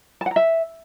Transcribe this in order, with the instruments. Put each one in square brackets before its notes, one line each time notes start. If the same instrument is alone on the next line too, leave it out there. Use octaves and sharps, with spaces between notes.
[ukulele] A5
F#5
A#5
E5